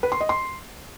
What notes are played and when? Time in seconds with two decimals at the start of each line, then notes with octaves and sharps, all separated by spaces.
0.03 B4
0.12 C6
0.21 D#5
0.29 C6